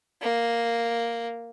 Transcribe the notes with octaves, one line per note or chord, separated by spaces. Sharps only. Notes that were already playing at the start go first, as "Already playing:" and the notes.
A#3